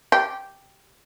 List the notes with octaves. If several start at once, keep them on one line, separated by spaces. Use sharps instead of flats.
G4